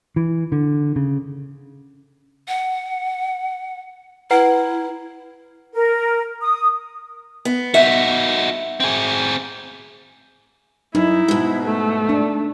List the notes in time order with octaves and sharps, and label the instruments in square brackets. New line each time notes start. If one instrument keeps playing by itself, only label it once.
[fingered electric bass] E3
D3
C#3
[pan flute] F#5
[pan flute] E4 [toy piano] B4 F#5 A#5
[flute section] A#4
D#6
[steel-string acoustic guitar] B3
[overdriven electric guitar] D#4 F#4 [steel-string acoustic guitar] E5
[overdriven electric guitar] C4 G#4
[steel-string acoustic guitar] F#2 [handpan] D#4 [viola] E4
[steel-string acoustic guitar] G#2 B2
[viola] A3
[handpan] D4